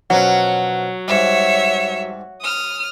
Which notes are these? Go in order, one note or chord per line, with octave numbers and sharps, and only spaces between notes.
B2 F3 F#3 C#4 F#5
G#2 G3 C#5 E5
D#6 F6